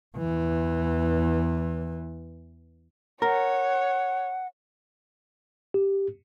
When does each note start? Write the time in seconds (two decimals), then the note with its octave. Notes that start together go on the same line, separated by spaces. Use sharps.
0.17 E2 E3
3.22 A#4 C#5 F#5
5.74 G4